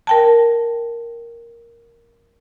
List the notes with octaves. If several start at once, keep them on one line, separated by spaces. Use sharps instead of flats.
A#4 G5 A5